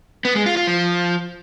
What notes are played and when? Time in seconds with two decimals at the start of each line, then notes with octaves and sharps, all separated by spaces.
0.25 B3
0.35 G#3
0.46 F4
0.57 F4
0.67 F3